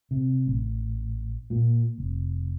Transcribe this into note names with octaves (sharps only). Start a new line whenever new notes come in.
C3
A1
A#2
F1